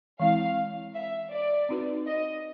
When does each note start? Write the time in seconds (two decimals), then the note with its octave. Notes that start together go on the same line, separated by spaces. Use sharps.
0.20 E3 G#3 C4 E4 F5
0.94 E5
1.31 D5
1.69 C4 D#4 F#4 B4 D5
2.07 D#5